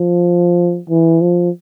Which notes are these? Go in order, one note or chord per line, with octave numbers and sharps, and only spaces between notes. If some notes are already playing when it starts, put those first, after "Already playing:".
Already playing: F3
E3
F3